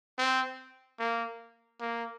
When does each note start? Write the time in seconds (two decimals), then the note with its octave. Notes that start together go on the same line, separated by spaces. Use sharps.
0.18 C4
0.99 A#3
1.80 A#3